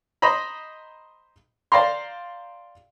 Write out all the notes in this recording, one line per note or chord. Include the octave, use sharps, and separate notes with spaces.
C5 D#5 A#5 B5
C5 D5 F5 G5 A#5 C6